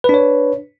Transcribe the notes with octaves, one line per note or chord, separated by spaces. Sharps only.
D4 B4 C#5